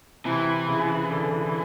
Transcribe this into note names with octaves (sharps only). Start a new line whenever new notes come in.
C3 E3
C#3
D3